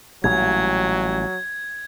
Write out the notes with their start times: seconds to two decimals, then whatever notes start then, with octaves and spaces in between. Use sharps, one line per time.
0.24 A1 A#2 F#3 G3 G#6